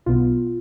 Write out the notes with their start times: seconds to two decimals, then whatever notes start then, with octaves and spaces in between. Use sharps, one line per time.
0.06 B1 B2 B3 F4